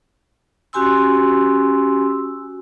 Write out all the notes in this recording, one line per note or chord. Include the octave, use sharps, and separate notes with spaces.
C#4 F#4 G4 G#5 C6 E6